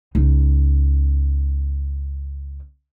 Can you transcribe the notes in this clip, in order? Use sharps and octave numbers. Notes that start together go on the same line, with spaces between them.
C#2 D#4